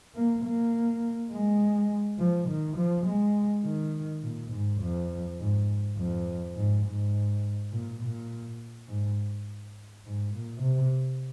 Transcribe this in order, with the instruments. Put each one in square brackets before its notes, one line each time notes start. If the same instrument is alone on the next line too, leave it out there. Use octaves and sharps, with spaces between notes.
[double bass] A#3
A#3
G#3
F3
D#3
F3
G#3
D#3
A#2
G#2
F2
G#2
F2
G#2
G#2
A#2
A#2
G#2
G#2
A#2
C3